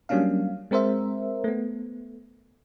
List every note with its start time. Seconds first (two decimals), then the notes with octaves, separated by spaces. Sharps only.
0.09 F#3 G3 A#3 C#4 D4 F5
0.71 G#3 C4 A#4 C5 E5
1.44 A3 B3